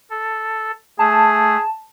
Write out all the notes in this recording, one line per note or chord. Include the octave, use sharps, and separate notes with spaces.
A4
A3 G#4 A5